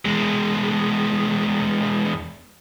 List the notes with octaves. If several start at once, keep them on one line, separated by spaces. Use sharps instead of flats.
E2 G#3